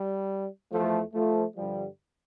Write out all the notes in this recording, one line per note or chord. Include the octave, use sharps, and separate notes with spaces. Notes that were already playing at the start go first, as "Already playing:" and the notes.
Already playing: G3
E2 E3 F3 A3
F3 A3
G2 D3 F3 G3